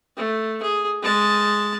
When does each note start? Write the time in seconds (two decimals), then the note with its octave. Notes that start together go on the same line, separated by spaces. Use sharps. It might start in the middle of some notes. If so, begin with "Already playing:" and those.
0.17 A3
0.62 G#4
1.02 G#3 A5